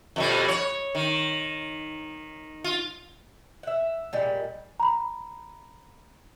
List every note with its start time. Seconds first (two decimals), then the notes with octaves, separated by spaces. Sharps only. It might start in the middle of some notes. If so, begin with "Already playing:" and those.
0.16 F2 B2 G3
0.48 C#5
0.95 D#3
2.64 F4
3.63 E5 F#5
4.13 A#2 G3 G#3
4.80 A#5 B5